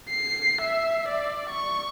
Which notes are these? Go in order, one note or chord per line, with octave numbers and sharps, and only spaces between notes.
C7
E5
D5
C#6